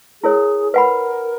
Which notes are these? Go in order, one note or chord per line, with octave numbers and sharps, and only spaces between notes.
E4 G#4 A#4 C#5
A#4 B4 F#5 B5